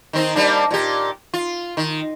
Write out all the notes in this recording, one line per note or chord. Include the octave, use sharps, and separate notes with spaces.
D#3 C4 D#4
G3 A#3 D4
A#2 G4
F4
D#3